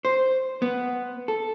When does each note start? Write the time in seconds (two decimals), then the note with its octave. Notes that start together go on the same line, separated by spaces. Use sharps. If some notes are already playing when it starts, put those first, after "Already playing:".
0.05 C5
0.62 B3
1.28 A4